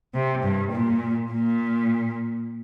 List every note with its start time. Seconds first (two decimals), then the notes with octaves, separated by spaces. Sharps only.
0.14 C3
0.44 G2
0.73 A#2
1.31 A#2